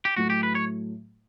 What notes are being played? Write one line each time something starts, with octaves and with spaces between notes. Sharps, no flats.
G4
A2 F#3 A3 F#4
G4
B4
C#5